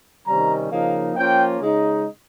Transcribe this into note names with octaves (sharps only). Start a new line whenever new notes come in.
C3 D#3 G3 C#4 A#5
C#3 F3 A#3 D#4
F3 A#3 C#4 F4 G5
C#3 G#3 D#4